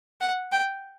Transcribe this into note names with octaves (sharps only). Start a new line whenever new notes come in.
F#5
G5